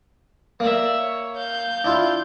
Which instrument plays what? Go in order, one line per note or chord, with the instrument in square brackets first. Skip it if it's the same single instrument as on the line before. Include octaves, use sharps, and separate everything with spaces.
[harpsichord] A#3 [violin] D5 E5
[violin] C#5
F5 G6
[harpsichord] D4 E4 F4